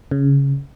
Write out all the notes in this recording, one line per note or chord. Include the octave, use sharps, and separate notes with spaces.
C#3